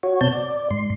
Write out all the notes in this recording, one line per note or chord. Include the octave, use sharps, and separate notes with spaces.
F#4 C#5
B2 C4 C#5 A5 G6
D5
G#2 C6